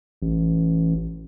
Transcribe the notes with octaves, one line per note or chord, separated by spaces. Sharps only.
A1